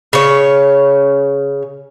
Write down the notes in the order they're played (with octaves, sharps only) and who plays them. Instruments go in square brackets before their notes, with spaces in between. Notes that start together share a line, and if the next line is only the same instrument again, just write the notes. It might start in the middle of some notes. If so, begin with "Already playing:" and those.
[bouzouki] C#3 C#5